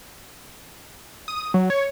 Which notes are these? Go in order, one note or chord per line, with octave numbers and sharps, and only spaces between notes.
D#6
F#3
C#5